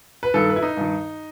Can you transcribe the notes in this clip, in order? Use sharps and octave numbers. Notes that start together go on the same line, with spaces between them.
B4
G2 D#3 A4
B4
E4
D#4
G2 D#3